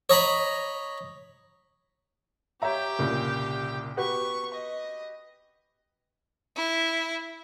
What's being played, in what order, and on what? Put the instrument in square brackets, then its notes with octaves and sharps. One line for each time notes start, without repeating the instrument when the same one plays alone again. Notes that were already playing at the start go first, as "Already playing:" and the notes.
[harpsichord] C#5 D#5 A#5 B5
[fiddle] G4 G5 [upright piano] C#5 E5 A#5
[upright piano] C2 A#2 C#3
[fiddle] B3 C#6 [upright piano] F#4 G4 B4
[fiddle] D#5
E4